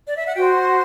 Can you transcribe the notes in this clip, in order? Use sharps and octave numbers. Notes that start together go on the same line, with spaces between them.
D5
E5
F#5
F#4 C5 G5